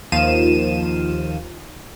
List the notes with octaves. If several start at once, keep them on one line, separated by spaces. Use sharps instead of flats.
D#2 D#3 F3 F5 D#7 E7